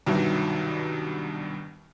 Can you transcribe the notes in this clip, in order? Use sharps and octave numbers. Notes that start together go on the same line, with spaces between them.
C2 G2 B2 D#3 F#3